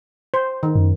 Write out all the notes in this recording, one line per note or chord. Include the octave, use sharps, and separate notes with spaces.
C5
D#3
F#2